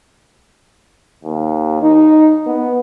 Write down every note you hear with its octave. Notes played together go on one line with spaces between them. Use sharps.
D#2
D#4
B3